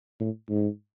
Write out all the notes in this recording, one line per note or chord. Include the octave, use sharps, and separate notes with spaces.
A2
G#2